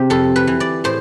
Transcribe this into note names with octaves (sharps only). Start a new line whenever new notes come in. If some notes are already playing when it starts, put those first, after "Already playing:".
Already playing: C3 G4
F2 A4
B4
E3
D5
A2 C5